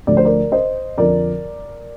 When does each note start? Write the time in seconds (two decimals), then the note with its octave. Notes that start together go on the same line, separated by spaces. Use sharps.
0.07 D2 D3 F3 D5
0.17 C5
0.25 A#4 D5
0.52 C5 D#5
0.98 F2 D3 F3 A#4 D5